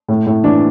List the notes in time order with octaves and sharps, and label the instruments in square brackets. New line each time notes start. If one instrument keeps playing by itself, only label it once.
[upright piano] A2
A2
E3 D4